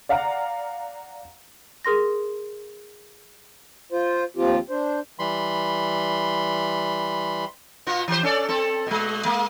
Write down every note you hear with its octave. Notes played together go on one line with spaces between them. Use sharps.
D5 F5 F#5 A#5 F6
G#4 A#4 C6 A#6
F4 C5
D#2 F3 C4 F4 G4
D4 C5
E3 G3 B5 C6
B2 B3 F4
E3 G4 C5
C#4 A4 D5
C4 A4
B2 G#3
G#3 A#3